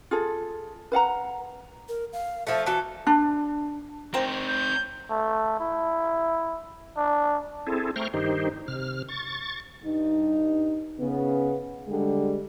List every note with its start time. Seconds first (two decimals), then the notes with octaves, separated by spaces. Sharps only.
0.11 F4 G#4 A4
0.92 B4 F5 F#5 A#5
1.89 A#4
2.13 F5
2.47 F3 A3 E5
2.66 E3 F#4 A4
3.07 D4
4.14 C4 D#4 A#4 C5 G5
4.48 G6
5.10 A3
5.60 E4
6.97 D4
7.67 C4 E4 G#4 A4
7.96 A3 C5 G5 A#5 C#6 F6
8.14 G2 D#3 D#4 G4 C5
8.68 C3 F6
9.08 C#6 A6
9.83 G2 D#4
10.99 C#3 B3
11.88 D3 G3 G#3